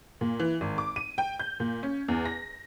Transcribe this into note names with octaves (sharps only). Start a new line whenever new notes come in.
A#2
E3
G#1
D6
D#7
G5
G6
A#2
C#4
E2
A#6